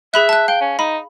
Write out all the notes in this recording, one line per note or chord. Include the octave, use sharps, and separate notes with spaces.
G#4 E5 B5 F#6
A5 F#6
F5 G5
C#4
D#4 B5